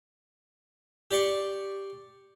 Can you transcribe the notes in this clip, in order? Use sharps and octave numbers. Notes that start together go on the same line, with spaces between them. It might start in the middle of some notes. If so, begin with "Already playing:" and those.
G4 D5 C6 C#6